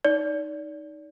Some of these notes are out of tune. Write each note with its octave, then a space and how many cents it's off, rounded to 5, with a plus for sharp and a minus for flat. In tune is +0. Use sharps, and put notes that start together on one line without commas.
D#4 +0 D5 -30